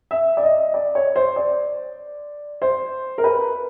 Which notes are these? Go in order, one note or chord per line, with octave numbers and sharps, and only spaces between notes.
E5
D5
D#5
D5
C#5
C5
D5
C5
A#4
B4